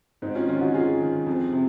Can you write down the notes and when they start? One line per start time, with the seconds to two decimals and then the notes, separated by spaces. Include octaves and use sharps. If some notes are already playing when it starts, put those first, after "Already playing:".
0.22 G#2 C4 D#4
0.35 C#4 F4
0.48 D#3 C#4 F4
0.61 D#4 F#4
0.74 G#2 F4 G#4
1.00 D#3
1.26 F2
1.53 C3